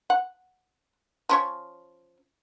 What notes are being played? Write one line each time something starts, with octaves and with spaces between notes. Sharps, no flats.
F#5
F3 C#4 C#5